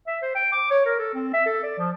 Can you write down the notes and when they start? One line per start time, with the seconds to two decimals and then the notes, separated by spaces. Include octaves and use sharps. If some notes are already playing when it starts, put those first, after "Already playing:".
0.07 E5
0.22 C5
0.35 G5
0.52 D6
0.71 C#5
0.85 A#4
0.99 A4
1.14 C4
1.34 E5
1.46 A4
1.63 D5
1.78 F3